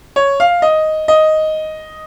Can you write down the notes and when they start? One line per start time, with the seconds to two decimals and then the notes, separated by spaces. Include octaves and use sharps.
0.16 C#5
0.40 F5
0.62 D#5
1.08 D#5